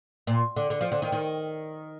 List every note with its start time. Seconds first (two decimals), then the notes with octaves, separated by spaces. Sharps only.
0.27 A#2
0.56 D3
0.70 D3
0.81 F3
0.92 D3
1.02 D#3
1.12 D#3